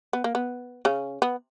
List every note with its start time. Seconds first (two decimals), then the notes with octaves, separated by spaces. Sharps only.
0.13 B3
0.24 A#3
0.35 B3
0.85 C#3 C#4
1.22 B3